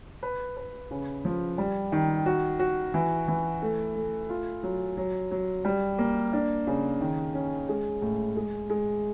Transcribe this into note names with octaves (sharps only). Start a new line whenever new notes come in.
B4
B4
C#3
F3
G3
D#3
F#4
F#4
E3
E3
A3
A3
F4
F#3
F#3
F#3
G3
A#3
D4
C#3
D#3
C#4
G#3
A2
G#3
G#3